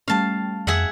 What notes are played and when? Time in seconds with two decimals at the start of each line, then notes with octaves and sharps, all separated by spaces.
0.08 G3 A3 C#4 F5 A5
0.67 F2 G#4 E5 F#5